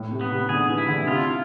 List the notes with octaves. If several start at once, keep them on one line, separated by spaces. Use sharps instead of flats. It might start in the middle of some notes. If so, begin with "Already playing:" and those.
Already playing: A2
C3
B3
C3
D3 G#4
E3
E4
D3
C3 F4